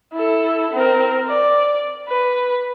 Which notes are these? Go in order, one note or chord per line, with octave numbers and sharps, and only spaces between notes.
E4 A4
C4 A#4
D5
B4